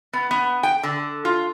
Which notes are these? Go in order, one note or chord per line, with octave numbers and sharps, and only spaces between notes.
B3
B3
G5
D3
F4